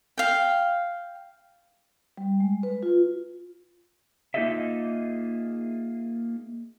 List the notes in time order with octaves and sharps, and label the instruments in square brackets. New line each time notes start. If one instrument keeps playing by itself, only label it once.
[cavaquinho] F5 G5
[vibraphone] G3
G#3
B4
F4
[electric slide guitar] A#3 D#4 F4 G#4 D#5 E5